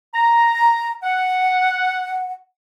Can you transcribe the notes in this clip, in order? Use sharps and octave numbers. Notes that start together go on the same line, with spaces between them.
A#5
F#5